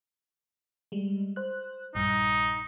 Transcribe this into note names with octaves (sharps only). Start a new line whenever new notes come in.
G3 G#3
C5 F#6
A#1 G2 D#4